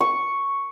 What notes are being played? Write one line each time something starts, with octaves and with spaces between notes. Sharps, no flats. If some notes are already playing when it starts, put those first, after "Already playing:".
C#6